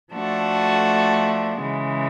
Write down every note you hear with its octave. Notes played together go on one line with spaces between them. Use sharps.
F3 A3 D4 F#4 A4
C#3 E3 G#3